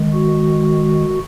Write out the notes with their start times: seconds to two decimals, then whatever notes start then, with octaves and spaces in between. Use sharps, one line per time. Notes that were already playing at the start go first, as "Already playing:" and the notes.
Already playing: D#3 G#3
0.13 F#4